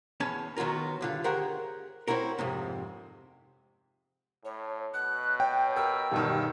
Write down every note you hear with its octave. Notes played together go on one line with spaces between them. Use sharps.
E2 C#4 C#5 G#5 A5
D#3 F#3 B3 F4 A#4
G2 D3 F4
G4 G#4 A#4 C5 C#5 F#5
C4 C#4 E4 F#4 A#4
F2 G#2 C3
A2 C#5
B2 F#6
C#5 G5
A#4 E6
E1 G2 D#3